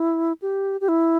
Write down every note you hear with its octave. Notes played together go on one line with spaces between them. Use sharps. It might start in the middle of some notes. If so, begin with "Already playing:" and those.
Already playing: E4
G4
G4
E4